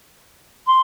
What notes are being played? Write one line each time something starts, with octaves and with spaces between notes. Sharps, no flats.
C6